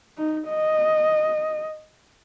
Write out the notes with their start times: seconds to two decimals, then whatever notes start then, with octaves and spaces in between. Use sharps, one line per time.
0.18 D#4
0.49 D#5